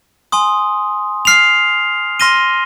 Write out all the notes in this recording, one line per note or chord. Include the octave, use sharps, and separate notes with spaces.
G#5 C6 D#6
F6 C7 F7
C6 F6 A#6 D#7 G7